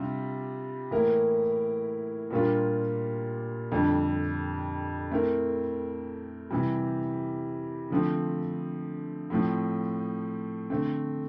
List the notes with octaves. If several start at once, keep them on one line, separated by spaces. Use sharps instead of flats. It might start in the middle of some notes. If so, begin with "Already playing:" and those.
Already playing: C3 G3 D4 F4
A2 E3 A#3 E4 A#4
A#2 G3 A#3 D4 F4
F2 D3 G3 D4
A3 C4 E4 A#4
C3 E3 G3
D3 F3 A3 C4
A2 F3 C4
D3 A3 C4